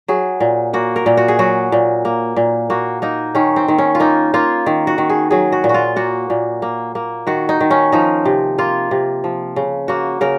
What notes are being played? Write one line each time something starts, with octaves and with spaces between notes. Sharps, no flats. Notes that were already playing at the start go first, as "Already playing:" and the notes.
F#3 G#4
A#2
A#3 F#4
A#4
A#2
F#4
G#4
F#3 F#4
A#2
A#3
A#2
A#3 F#4
A#3 D#4
D#3 C#4
C4
D#3
C#4
F4
A#3 D#4
A#3 F4
D#3
F#4
D#3
G#4
F#3 G#4
F#4
A#2
F#4
F4
A#3 F#4
A#2
A#3
A#3
D#3 F#4
D#4
D#3
C#4
F3 D#4
C3
A#3 F4
C3
F3
C#3
A#3 F#4
C#3 A#4